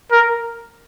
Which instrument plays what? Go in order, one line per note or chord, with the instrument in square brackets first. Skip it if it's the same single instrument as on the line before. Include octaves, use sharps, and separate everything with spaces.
[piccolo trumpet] A#4